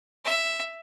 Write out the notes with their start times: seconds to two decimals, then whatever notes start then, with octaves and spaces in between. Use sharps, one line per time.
0.25 E5